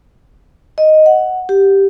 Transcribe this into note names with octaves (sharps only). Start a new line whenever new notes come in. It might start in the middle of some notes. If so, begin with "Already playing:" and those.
D#5
F#5
G4